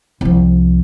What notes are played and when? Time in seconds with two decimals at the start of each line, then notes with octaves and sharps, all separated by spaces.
0.21 C2 F3